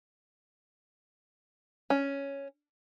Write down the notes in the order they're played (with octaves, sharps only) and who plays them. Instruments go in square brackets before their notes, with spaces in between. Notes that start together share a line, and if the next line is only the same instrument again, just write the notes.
[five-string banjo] C#4